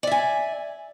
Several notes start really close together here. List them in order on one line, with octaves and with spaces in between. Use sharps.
D5 E5 G#5